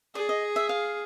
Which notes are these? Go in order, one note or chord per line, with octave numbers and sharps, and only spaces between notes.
G#4 D5
D#5
E5
F5